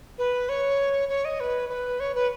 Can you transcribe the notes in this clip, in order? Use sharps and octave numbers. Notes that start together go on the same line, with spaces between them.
B4
C#5
C#5
D#5
B4
B4
C#5
B4